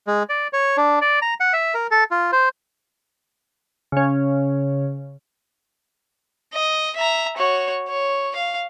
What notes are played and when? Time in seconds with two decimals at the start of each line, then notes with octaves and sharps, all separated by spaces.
0.07 G#3
0.29 D5
0.53 C#5
0.77 D4
1.01 D5
1.22 A#5
1.40 F#5
1.53 E5
1.74 A#4
1.91 A4
2.11 F4
2.33 C5
3.92 C#3 C#4
6.54 D#5
6.96 E5 A#5
7.37 F#4 C#5
7.88 C#5
8.36 F5